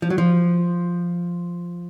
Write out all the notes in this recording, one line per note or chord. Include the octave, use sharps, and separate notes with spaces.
F3
F#3
F3